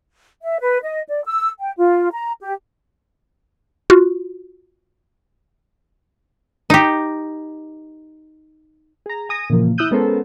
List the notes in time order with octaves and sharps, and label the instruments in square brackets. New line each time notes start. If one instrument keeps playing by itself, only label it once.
[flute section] E5
B4
D#5
D5
E6
G5
F4
A#5
G4
[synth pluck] F4 F#4
[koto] D#4 G4
[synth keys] G#4 A#5
G#5 D#6 A#6
A#2 C#3 E3 F3 A#3
E4 D#6 E6 F#6 G6 D#7
G#3 B3 C#4 A4 A#4 C5